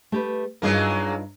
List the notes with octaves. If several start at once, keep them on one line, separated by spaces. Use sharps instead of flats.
A3 G4 B4
G2 F#3 G#3 A#3 D#4 F4